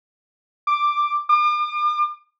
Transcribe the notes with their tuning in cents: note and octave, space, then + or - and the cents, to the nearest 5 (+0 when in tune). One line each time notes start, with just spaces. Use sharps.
D6 +10
D6 +45